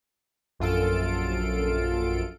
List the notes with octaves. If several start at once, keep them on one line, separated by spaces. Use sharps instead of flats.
A#1 F#2 F4 A4 D7